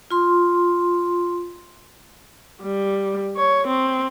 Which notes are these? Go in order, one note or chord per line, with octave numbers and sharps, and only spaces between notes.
F4 C6
G3
C#5
C4